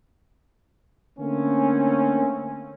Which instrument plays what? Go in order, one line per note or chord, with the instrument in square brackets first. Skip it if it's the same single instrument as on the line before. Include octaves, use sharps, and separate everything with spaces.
[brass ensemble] D3 A3 A#3 C4 C#4